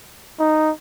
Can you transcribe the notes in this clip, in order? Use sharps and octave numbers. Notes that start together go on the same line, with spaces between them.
D#4